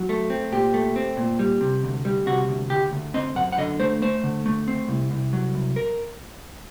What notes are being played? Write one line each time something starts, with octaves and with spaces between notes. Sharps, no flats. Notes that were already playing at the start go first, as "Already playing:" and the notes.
Already playing: F#3
A3
C4
A#2 G4
A3
C4
A#2
G3
C3
D2
G3
C3 F#4
D2
D2 G4
D2
C4 D#5
F#2 F#5
F#5
D3 D#5
A3 C5
A3 C5
D3
A3
C4
C2
C2
F#3
C2
A#4